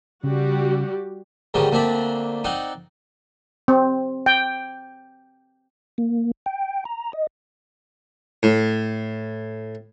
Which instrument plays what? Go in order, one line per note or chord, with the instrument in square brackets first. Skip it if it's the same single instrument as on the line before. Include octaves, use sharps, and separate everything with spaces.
[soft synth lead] C#3 [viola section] G3 F#4 G4
[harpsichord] D2 G#2 D#3 G3 C#4
D2 A#3 C4 D4 B5
C4 D#4 D5 F#5
[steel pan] C4
G5
[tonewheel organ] A#3
G5
A#5
D#5
[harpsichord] A2